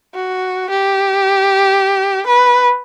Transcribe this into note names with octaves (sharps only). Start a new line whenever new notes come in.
F#4
G4
B4